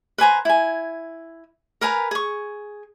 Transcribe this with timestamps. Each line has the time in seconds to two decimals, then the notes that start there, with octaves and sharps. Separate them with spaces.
0.18 B4 C5 G#5 A#5
0.45 E4 G#5
1.81 A#4 B4 G#5 A#5
2.11 G#4 C#6